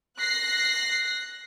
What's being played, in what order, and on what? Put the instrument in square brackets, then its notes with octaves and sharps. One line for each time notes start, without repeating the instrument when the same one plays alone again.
[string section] F#6 A#6 C7